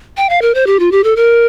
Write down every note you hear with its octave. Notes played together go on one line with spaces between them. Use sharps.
G5
F5
A#4
C5
G4
F4
G4
A4
A#4